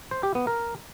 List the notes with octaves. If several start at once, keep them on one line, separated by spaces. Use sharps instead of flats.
C5
G4
B3
A#4